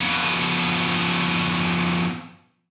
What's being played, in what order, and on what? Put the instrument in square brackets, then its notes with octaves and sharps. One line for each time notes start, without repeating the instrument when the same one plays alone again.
[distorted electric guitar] F2 B2